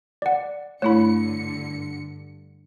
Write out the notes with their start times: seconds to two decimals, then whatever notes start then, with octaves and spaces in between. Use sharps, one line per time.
0.22 D5 F#5
0.82 G2 D3 A3 E4 C#5 B5 C#7